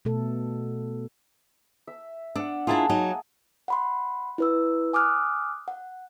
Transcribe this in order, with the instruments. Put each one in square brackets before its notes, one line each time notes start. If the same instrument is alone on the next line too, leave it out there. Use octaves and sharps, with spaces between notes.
[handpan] B2 A3 A4
[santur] E5
[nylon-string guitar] D4 [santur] F#5 E6
[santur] A#3 G#4 A5 [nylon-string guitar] D4 E4 F4
[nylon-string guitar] F#3 D#4
[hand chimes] F#5 B5 C6
E4 B4 E6
G#5 D6 D#6 F6 F#6
F#5